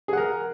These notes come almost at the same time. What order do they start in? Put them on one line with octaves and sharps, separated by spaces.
G#4 F#5 A#4